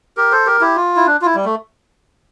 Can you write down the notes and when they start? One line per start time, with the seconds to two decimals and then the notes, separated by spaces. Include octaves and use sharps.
0.17 G4 A#4
0.32 A4 C5
0.46 G4 A#4
0.61 E4 G4
0.76 F4
0.96 E4
1.06 D4
1.22 F4
1.26 E4
1.35 G3
1.45 A3